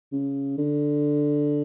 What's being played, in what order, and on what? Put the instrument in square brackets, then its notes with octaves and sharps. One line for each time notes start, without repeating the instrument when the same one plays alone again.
[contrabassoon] C#3
D3